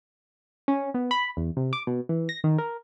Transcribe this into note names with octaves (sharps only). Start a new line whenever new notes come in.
C#4
B3
B5
E2
C3
D6
B2
E3
A#6
D#3
A#4